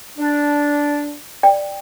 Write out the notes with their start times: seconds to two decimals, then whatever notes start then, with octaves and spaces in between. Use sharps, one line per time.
0.18 D4
1.43 D5 G5